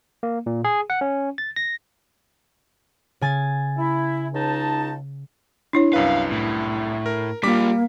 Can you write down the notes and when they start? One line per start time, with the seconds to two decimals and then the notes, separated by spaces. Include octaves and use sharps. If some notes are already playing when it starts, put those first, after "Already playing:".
0.23 A#3
0.46 A#2
0.64 G#4
0.90 F#5
1.01 C#4
1.38 A6
1.56 A#6
3.21 C#3 G#5 A6
3.77 E4
4.33 C#2 D#4 A5
5.73 D4 E4 C#5
5.93 C2 F#2 B4 F5
6.32 A2
7.06 A#4
7.43 G3 A#3 D4 F4 D6 B6